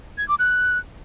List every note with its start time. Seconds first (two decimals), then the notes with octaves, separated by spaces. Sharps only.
0.18 G#6
0.29 D6
0.39 F#6